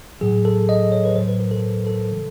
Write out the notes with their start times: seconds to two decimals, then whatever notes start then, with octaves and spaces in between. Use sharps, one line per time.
0.21 A2 F#3 G#4
0.45 A4
0.69 D#5
0.92 C#5
1.05 B4
1.15 A2 F#3 C5
1.28 B4
1.40 A#4
1.51 A4
1.87 A4
2.11 C#3 E3 G3